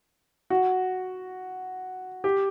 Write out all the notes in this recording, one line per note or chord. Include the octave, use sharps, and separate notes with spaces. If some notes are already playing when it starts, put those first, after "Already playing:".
F#4
G4